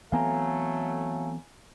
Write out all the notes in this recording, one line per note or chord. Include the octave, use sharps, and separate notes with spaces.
E3 F#3 A3 B3 C4 F5 G#5 A#5